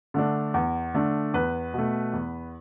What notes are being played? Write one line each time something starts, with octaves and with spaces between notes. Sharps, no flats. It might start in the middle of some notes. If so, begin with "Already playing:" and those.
D3 A3 D4
E2
D3 A3 D4
E2 B4
B2 A3
E2